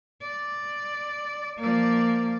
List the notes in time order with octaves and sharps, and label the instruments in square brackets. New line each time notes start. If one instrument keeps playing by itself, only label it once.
[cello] D5
[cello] F3 D5 [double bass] A#3